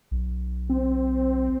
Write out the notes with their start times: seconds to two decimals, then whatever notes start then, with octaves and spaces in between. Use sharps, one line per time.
0.11 B1
0.70 C4